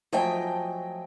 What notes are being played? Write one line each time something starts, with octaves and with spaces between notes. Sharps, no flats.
F3 F#3 A3 D#5 G5 G#5